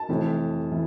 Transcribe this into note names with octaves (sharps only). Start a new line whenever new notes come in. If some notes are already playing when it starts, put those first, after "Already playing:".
Already playing: A5
F1 F2 E3
E3